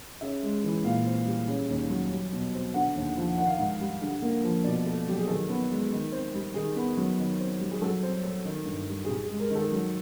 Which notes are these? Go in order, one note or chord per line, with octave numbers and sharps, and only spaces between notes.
C#3 E5
G#3
E3
A#2 F5
C4
G3
C#3
D#2
F#3
G3
B2
C4
D3 F#5
D#2
F3
D#3 F#5
F5
G#2 F#5
G3
D3
A#3
F3
B2 D5
A3
F#3 G4
G#4
D#3 A4
B3
G#3
D#3
C4
G3
D#3 G#4
B3
F#3
D#3
C4
G3
G#4
F#3 A4
C4
A3
D#3
G2
G3
G#4
C3 G4
G#4
G#3
A#4
D#3 A4
F#3